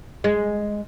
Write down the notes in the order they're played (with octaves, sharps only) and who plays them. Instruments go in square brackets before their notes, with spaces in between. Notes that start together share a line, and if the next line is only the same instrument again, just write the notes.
[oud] G#3